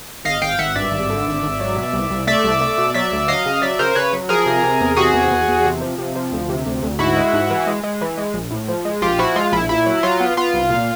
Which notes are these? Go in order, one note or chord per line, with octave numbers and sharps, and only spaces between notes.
G#1 D#5 F5
G#1 F5 G5
G#1 E5 F#5
G2 D5 E5
G#1
D3
G#1
G#1
F#3
B2
C2
C2
A3 D5 E5
C2
A3
B2
F#3 D5 E5
D2
F#3 D#5 F5
C#3
F#3 D5 E5
C#3 A#4 C5
C#3 B4 C#5
F#3
F3 G#4 A#4
C3
C3
E2
C3 F#4 G#4
E2
E2
E2
C3
F3
C3
F3
D2
C3
D2
D2
G#2 E4 F#4
G#3
G#2
E3
G#3
G#3
E3
G#3
A#1
A2
F3
G#3
A#1 F4 G4
F3 E4 F#4
G#3 F4
A#1 E4
A#2 E4
F#3
F#3 F4
B3
B3 F4
C2
A#2